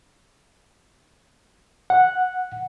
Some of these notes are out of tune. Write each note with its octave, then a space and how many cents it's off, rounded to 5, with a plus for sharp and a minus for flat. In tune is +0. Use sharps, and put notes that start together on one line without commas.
F#5 -5